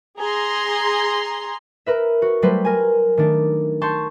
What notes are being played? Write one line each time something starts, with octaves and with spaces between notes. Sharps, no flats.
G#4 A#5 C6
A#4 B4 E5
F#4
F#3 G3 A3 B4 C5
A#4 G#5
D#3 A3 D4
A5 C6 C#6 G6